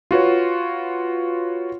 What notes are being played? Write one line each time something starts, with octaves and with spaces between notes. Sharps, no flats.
F4 F#4 B4 C#5